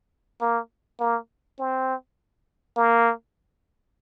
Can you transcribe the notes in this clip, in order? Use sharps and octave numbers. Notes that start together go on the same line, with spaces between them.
A#3
A#3
C4
A#3